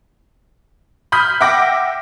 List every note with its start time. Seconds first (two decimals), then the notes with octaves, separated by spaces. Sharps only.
1.12 B5 D#6 F6 G6 B6
1.41 E5 F#5 G5 D6 A#6